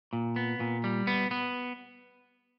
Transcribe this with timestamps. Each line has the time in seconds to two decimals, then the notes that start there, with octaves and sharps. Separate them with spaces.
0.13 A#2
0.36 B3
0.60 A#2
0.84 G3
1.07 B3
1.31 B3